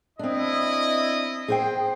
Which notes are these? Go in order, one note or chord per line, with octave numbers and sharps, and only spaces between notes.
C4 D4 E4 D#5
G#4 C5 G5